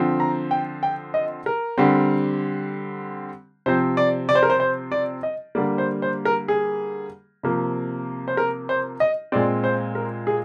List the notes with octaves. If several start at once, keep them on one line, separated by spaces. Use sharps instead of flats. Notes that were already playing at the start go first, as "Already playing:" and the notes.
Already playing: D3 F3 C4
A#5
G5
G5
D#5
A#4
D3 G3 C4
C3 F3 C4 C5
D5
D5
C5
A#4
C5
C5
D5
D#5
D3 G3 A#3 D5
C5
C5
A#4
G#4
C3 F3 A#3
C5
A#4
C5
D#5
A#2 G#3 C4 D5
C5
A#4
G#4